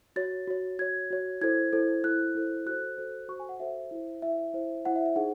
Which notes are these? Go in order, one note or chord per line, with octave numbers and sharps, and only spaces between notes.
F#4 C#5 A6
F#4 C#5
F#4 C#5 G#6
F#4 C#5
E4 A4 C5 G#6
E4 A4 C5
E4 A4 C5 F#6
E4 A4 C5
F#4 A4 C5 F#6
F#4 A4 C5
F#4 A4 C5 C#6
G#5
F#5
F#4 A4 C5 E5
E4 C5
E4 C5 E5
E4 C5
E4 C5 F#5
E5
E5
D#4 G#4 C5 F#5